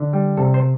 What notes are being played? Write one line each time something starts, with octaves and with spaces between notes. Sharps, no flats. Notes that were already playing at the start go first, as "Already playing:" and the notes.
Already playing: D3
G3
C3 A4
C5